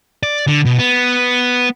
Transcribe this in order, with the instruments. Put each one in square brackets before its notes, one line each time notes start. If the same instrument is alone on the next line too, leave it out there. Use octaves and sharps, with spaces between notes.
[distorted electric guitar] D5
D3
B2
B3